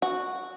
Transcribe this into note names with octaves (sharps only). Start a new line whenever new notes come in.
F#4